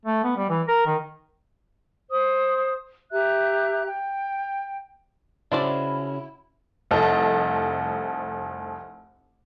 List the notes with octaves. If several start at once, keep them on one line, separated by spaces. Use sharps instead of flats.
A3
B3
G3
E3
A#4
D#3
C5 D#6
G4 E5 A#5 F#6
G5
C#3 C#4 D4 E4 F#4 C5 D5
F1 C2 A4 D#5